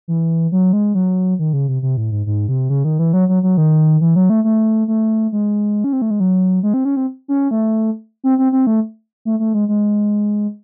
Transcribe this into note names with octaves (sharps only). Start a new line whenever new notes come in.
E3
F#3
G#3
F#3
D#3
C#3
C3
C3
A2
G#2
G#2
C3
C#3
D#3
E3
F#3
F#3
F#3
D#3
E3
F#3
A3
A3
A3
G#3
C#4
C4
A3
G#3
F#3
G#3
C4
C#4
C4
C#4
A3
C4
C4
C4
A3
A3
A3
G#3
G#3